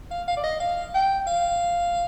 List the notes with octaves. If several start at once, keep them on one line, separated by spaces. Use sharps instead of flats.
F5
F5
D5
D#5
F5
G5
F5